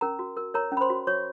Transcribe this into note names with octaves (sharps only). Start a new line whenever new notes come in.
C#4 A#4 A#5
F#4
A#4
A#4 C#5 A#5
C#4
B5
C5 C6
F#4
F#4 C#5 C#6